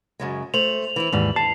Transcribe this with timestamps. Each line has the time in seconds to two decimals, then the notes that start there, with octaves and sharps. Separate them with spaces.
0.19 F#2 C#3 G#3
0.54 A3 C5 F7 F#7
0.96 E3 C4 E4
1.12 D#2 G#2 E3 G3
1.36 D3 A5 C7